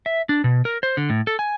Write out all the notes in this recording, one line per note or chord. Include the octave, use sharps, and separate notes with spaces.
E5
D4
B2
A#4
C5
D3
A2
A4
G#5